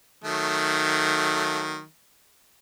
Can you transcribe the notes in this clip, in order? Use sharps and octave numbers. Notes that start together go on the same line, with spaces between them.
D#3 F#3 A3